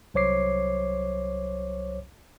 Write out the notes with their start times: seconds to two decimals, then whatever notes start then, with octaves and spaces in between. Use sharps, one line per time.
0.14 C2 F#3 C5 C#5 D6 C7